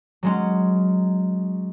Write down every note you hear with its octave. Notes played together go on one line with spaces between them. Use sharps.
F#3 G#3 C#4